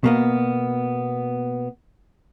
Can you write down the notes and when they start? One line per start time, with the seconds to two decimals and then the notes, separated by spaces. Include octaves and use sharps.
0.04 B2 A#3 B3